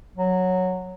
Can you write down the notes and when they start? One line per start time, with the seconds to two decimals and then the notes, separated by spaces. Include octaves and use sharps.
0.17 F#3